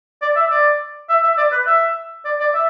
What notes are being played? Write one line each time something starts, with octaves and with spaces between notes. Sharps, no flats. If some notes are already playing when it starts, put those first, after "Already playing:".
D5
E5
D5
E5
E5
D5
B4
E5
D5
D5
E5